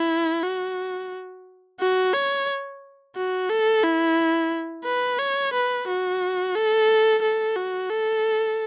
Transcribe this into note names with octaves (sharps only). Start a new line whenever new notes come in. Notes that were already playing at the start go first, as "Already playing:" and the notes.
Already playing: E4
F#4
F#4
C#5
F#4
A4
E4
B4
C#5
B4
F#4
A4
A4
F#4
A4